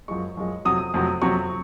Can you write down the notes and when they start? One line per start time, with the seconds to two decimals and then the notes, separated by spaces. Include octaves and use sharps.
0.08 F#2 F3 G#3 C#6
0.37 F#2 F3 G#3
0.65 F2 C3 F#3 D#6
0.94 F2 C3 F#3
1.22 F2 C3 F#3 C#6